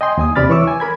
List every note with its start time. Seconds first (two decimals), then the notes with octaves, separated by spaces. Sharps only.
0.01 D#5 G5 G#5 C6
0.18 D#2 G#5 D#6
0.36 D#2 C3 D5 B5 F6 A6
0.49 E3 C#5 C#6 D6 E6
0.68 G#5
0.80 A#4 B5 G#6